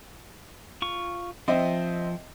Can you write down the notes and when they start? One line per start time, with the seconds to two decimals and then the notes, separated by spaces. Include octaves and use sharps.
0.82 F4 C#6
1.48 F3 C4 D#5 E5